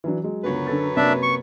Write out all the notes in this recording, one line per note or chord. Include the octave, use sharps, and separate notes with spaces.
E3 F#3 D4
F#3 G#3
C#2 F#2 D3 F#3 B3 B4
D3 A4 A6
C3 A#3 D4 E5
C#6